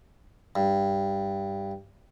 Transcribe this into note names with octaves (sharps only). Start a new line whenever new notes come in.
G2